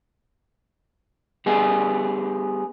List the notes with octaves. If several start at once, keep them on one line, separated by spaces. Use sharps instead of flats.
G3 B3 G#4